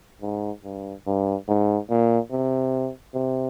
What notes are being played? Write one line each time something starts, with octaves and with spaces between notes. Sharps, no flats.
G#2
G2
G2
G#2
A#2
C3
C3